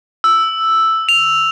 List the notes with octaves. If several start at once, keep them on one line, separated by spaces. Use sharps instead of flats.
E6
F7